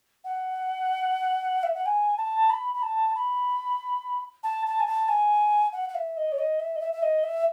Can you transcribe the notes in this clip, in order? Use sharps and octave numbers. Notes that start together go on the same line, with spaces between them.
F#5
E5
F#5
G#5
A5
B5
B5
A5
B5
A5
A5
G#5
A5
G#5
F#5
F#5
E5
D#5
C#5
D#5
E5
D#5
E5
E5
D#5
E5